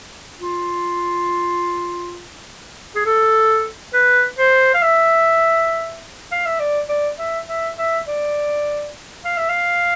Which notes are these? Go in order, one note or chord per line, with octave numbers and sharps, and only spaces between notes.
F4
G#4
A4
B4
C5
F5
E5
F5
E5
D5
D5
E5
E5
E5
D5
F5
E5
F5